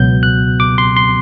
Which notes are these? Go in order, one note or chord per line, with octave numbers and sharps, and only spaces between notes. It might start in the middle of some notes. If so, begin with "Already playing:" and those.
Already playing: C#2 B2 F#3 B3 G6
F#6
D6
C6
C6